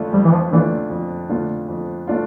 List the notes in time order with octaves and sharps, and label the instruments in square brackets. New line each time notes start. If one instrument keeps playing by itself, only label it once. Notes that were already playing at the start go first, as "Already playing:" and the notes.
Already playing: [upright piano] F2 D3 A3 D4 F4
[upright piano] F2 [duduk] G3
[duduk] E3
F3
[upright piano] D3 A3 D4 F4 [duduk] E3
[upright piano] F2
D3 A3 D4 F4
F2
A3 D4 F4